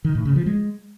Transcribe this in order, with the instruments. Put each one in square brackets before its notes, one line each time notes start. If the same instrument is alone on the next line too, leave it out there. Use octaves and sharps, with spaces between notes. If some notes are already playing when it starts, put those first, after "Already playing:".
[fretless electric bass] D#3
A2
C#3
F3
G#3